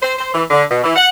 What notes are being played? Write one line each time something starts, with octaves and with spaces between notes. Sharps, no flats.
C5
C5
E3
D3
B2
E3
F#5